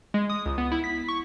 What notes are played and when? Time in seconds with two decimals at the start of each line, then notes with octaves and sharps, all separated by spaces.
0.14 G#3
0.29 D#6
0.46 C#2
0.58 B3
0.72 E4
0.84 B6
1.08 C#6